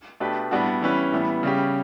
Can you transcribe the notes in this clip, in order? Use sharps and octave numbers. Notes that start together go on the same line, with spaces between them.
B2 A3 D4 G4 B4
A2 G3 B3 D4 F#4
E3 G3 C#4 E4 B4
A2 E3 G3 B3
C#3 G3 C#4 G4